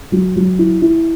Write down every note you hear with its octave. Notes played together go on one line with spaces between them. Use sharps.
F#3
F#3
E4
E4